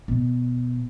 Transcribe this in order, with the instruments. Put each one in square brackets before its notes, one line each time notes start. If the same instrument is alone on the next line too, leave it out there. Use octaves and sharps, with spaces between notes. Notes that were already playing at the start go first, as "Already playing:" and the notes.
[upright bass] B2